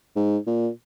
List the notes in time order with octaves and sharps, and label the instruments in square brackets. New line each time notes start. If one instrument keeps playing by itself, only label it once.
[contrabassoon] G#2
A#2